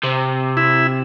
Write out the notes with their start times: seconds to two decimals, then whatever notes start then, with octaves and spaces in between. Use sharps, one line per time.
0.04 C3
0.57 E4